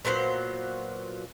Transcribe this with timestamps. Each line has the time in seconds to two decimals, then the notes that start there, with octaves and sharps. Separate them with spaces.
0.05 A#2 F#3 B3 C5